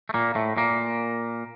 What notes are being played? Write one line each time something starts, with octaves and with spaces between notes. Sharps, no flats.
A3
A#2 A#3
A2 A3
A#2 A#3